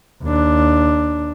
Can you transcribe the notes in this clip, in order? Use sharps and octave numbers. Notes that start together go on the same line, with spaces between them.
D#2 D4